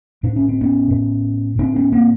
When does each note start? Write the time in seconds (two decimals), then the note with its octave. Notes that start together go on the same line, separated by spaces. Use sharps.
0.23 A2 D4
0.36 C#4
0.49 C4
0.61 B3 C#4
0.91 A2
1.59 A2 C4 D4
1.76 B3 C#4
1.92 A#3 C4